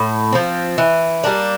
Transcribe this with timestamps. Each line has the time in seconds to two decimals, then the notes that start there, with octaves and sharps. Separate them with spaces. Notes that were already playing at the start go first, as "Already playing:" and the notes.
Already playing: A2
0.33 F3 C4
0.78 E3
1.24 G3 A#3 D4